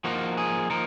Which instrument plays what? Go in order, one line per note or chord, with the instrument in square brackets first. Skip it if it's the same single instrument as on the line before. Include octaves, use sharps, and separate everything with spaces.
[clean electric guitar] F3 A#3 D#4 F#4
G#4
F3 A#3 D#4 A#4